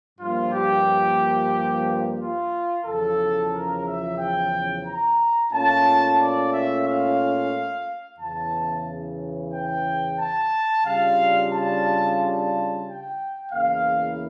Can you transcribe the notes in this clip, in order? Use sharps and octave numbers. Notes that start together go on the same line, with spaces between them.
G2 F3 A#3 F4
G4
F4
E2 C#3 F3 A4
A#4
E5
G5
A#5
A#2 A3 C#4 F4 A5
D5
E5
F5
E2 C#3 E3 A5
G5
A5
C#3 G3 D4 F4 F5
A5
A5
G5
E2 C#3 E3 A#3 E4 F5